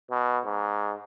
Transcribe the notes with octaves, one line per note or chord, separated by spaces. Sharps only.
B2
G#2